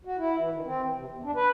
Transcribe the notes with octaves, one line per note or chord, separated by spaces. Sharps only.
F#4
E4
E3
D#3
C4
E3
C3
E2
D4
B4